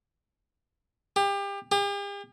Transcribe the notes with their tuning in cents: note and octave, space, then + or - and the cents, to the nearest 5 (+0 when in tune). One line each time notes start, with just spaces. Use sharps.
G4 +30
G4 +45